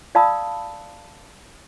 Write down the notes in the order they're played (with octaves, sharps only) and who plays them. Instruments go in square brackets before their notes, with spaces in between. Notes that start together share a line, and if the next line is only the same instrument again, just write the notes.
[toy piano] D5 F5 A5 B5 D#6 E6